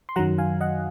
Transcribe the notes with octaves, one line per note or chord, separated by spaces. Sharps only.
C6
F#2 D#3 F#3 F#5 A#5
F5 G#5
D#5 F#5